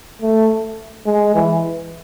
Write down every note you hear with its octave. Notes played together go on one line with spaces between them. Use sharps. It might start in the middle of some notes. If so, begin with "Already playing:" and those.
A3
G#3
E3